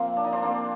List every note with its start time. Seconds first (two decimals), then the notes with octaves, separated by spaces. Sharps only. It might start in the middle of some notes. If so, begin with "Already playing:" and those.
Already playing: C3 F3 A#3 C4
0.16 D4
0.24 D#4
0.32 C4 D4
0.43 A#3 C4